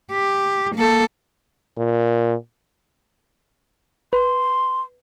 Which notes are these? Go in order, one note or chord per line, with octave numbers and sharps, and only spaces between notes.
G4
A#3 A4
A#2
B4 C6